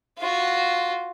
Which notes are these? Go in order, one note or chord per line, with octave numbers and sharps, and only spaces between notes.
F4 F#4